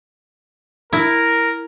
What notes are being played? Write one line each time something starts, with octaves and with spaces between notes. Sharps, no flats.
E4 A#4